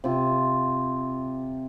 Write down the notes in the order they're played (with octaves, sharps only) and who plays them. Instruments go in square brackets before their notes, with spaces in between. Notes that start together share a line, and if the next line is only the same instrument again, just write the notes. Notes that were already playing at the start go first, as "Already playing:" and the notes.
[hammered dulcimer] C3 F4